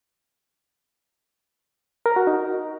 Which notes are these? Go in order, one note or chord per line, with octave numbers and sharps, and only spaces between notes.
A#4
F#4
D#4